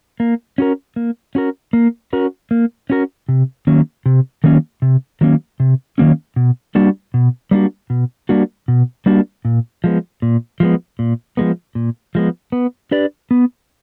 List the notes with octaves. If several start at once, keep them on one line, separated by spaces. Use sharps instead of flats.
A#3
C#4 F#4 A#4
A#3
C#4 F#4 A#4
A#3
C#4 F#4 A#4
A#3
C#4 F#4 A#4
C3
D#3 F#3 A#3 C#4
C3
D#3 F#3 A#3 C#4
C3
D#3 F#3 A#3 C#4
C3
D#3 F#3 A#3 C#4
B2
G3 A#3 D4 F#4
B2
G3 A#3 D4 F#4
B2
G3 A#3 D4 F#4
B2
G3 A#3 D4 F#4
A#2
F3 G#3 B3
A#2
F3 G#3 B3
A#2
F3 G#3 B3
A#2
F3 G#3 B3
B3
D4 G4 B4 D5
B3